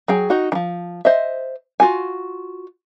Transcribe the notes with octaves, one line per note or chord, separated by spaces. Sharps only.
F#3 G#4 G5
D#4 F#4
D#3 F3
C5 D#5 E5
F4 F#4 G#5